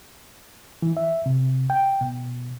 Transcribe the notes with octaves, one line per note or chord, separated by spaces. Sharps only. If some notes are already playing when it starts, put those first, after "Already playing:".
E3
E5
C3
G5
B2